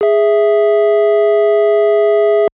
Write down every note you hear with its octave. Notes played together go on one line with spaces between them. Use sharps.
G#4 E5